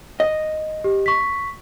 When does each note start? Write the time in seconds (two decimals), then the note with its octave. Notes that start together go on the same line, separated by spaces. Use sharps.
0.20 D#5
0.84 G4
1.06 C#6 B6